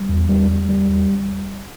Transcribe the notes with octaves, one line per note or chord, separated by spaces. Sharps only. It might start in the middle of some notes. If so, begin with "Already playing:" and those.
Already playing: G3
E2
G3
G3
G3
E2